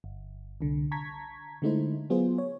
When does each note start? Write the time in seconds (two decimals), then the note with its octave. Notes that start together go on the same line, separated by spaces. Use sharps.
0.04 G1
0.61 C2 D3
0.92 A5 A#5 C#6 G#6 B6
1.62 D3 G#3 A3 D#4 E4 C5
2.10 F#3 B3 F4 G#4 C5
2.38 C#5